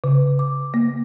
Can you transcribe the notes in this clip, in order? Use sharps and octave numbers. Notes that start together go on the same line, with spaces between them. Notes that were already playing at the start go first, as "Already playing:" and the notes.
C#3
D6
A#3